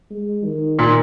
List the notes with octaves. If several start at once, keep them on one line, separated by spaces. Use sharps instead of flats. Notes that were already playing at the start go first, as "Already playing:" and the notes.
G#3
D#3
A#2